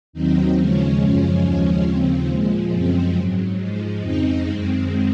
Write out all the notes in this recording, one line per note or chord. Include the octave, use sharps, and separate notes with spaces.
D#2 D#3 F#3 C4 D#4
D#2 C#3 F3 G#3 C#4
F#2 C#3 F3 G#3
D#2 C#3 F3 G#3
D#2 C#3 F3 C4
A#2 F3 G#3
F#2 C#3 F3 G#3 C4
G#2 F#3
G#2 F3 G#3
F2 C#3 G#3 C4 D#4
F#2 D#3 G#3 C4